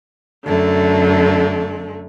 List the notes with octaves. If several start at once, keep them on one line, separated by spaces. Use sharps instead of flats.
F#2 D3 A3